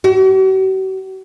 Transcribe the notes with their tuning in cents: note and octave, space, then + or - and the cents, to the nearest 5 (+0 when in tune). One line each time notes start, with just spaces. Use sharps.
F#4 +45